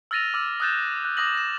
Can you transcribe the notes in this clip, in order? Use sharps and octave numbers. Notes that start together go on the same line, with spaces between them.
E6 F6 A6 A#6 D#7 F7
D6 E6 F6
D#6 E6 F#6 G6 A6 E7
F#6
D6 D#6 A#6 F#7
A#6 E7